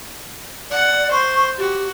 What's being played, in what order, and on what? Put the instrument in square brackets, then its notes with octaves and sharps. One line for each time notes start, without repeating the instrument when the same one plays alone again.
[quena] D5 [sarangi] F#5
[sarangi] C5 [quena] C#6
[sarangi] F#4 [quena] G4